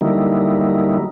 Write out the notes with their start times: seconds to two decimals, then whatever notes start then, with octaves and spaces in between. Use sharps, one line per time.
0.01 D3 F#3 G3 A#3 D#4 E4